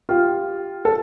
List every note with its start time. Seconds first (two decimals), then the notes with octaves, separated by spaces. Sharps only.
0.09 F4 G4
0.85 A4